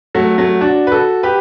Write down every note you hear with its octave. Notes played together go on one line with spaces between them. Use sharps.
F#3 A3
F#3 A3
D4 F#4
B4
F#4 A4
G4 B4